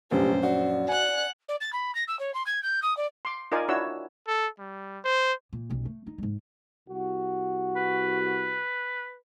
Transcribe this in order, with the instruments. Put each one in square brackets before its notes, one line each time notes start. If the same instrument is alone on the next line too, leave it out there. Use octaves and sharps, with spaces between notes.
[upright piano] F1 [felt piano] A#1 F#2 [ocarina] G4 [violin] C5
[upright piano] F#4 [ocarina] D5
[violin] F#5 F#6 [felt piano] G#5
[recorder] D5
A6
B5
A#6
E6
C#5
C6
G#6
G6
D#6
D5
[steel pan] C6 D6
D#4 F4 A#4 D5 G#5
D4 E4 F#4 C#5 E6
[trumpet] A4
G3
C5
[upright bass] A#2
D#1 B1
A3
D#4
G#2 G#3
[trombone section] C2 F#4
[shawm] B4